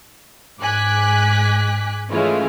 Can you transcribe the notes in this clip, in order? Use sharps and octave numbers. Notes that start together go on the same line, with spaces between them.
G#2 G#5 D6 F#6 B6
E3 G#3 A3 C#4 E4 F4